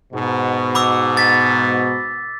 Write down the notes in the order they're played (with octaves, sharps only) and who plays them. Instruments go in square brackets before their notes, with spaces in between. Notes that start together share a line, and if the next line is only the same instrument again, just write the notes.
[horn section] G#2 B2
[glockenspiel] B5 D6 E6
A6 B6